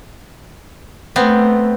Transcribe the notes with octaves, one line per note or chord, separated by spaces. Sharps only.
A3 B3 C4